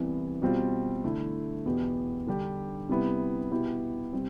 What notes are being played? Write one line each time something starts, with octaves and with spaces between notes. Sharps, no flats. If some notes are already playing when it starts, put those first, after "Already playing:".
Already playing: C2 C3 E3 B3
B2 G3 C4 F4
D3 A3 E4
E2 B2 B3 E4 G4
D3 G3 D4 G4
C3 G3 B3 E4
B2 B3 E4 G4
C3 G3 C4